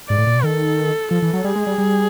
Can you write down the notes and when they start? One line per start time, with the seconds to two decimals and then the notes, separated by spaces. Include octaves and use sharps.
0.09 G#2 D5
0.18 A2
0.27 A#2
0.35 B2
0.44 D#3 A4
1.11 F3 A4
1.22 E3
1.33 F#3
1.44 G3 G#4
1.56 G#3
1.67 G3
1.78 G3